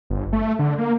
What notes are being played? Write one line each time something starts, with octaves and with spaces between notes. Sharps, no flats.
G1
A3
D3
A#3